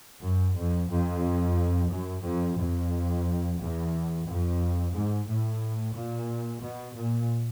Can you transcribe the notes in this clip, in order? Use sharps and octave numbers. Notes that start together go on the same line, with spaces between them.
F#2
F2
F2
F#2
F2
F2
E2
F2
G#2
A2
A#2
B2
A#2